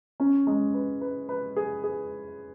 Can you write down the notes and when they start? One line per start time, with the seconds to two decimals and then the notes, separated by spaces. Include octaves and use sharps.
0.20 C#4
0.47 G#3
0.74 B4
1.01 B4
1.29 B4
1.56 G#4
1.84 G#4